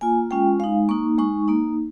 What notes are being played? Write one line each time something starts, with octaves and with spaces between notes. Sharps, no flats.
A#3 F4 G#5
G#3 C#4 F4 G5
G#3 D#4 F5
A#3 D#4 C#6
G#3 D#4 C#6
A#3 D#4